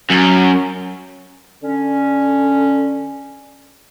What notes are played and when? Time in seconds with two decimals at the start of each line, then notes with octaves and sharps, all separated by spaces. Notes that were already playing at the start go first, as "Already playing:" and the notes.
0.10 F#2
1.63 D3 C#4